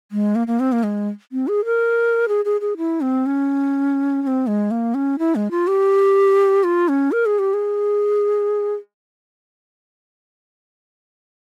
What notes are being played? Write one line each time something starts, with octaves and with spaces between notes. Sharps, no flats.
G#3
A#3
A#3
C4
A#3
G#3
C4
G#4
A#4
G#4
G#4
G#4
E4
C4
C#4
C#4
C4
G#3
A#3
C#4
E4
G#3
F4
G4
F4
C#4
A#4
G#4
G4
G#4